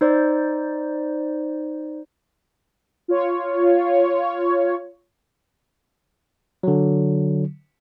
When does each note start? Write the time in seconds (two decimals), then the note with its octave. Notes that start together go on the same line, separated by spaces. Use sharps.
0.01 D#4 C5 D5
3.08 F4 C#5
6.63 D3 F#3